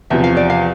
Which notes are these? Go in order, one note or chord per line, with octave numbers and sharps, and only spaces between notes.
E2 C3 F3 E5
F5
D5
F5